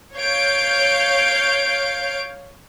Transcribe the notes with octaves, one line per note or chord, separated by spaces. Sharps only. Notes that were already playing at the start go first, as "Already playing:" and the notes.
C#5 F5 G6 D7